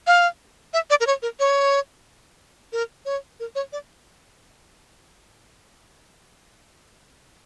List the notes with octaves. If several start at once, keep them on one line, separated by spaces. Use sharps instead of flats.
F5
E5
D5
A#4
C#5
A#4
C#5
A#4
C#5
A#4
C#5
D5